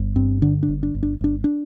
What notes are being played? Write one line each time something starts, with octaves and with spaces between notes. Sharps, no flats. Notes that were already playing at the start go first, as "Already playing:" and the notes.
Already playing: G1
G2 C4
D3 D4
D4
G1
D4
G1
D4
G1 D4
D4